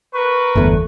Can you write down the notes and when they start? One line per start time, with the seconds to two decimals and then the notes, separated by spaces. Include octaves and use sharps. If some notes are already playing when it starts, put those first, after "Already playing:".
0.13 A#4 B4 C#6
0.56 G1 E2 A3